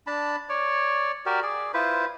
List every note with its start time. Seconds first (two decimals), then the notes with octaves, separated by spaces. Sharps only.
0.07 D4 A5 B5
0.49 C#5 D5
1.26 F#4 G4 A#4 D5
1.42 G#4 D5
1.74 E4 F4 B4 C5